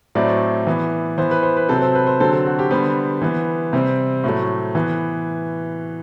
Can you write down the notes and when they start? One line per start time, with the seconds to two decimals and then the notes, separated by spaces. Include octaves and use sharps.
0.15 A2 F#3 A3 C4 D5
0.67 E3 B3
1.18 E3 B3 C5
1.31 B4
1.43 C5
1.57 B4
1.69 C3 F#3 C4 A4
1.82 C5
1.95 B4
2.07 C5
2.20 D3 F#3 C4 A4
2.32 A4
2.46 F#4
2.59 G4
2.71 D3 G3 B3 C5
3.22 E3 B3
3.73 C3 G3 C4
4.24 A2 F#3 A3
4.75 E3 B3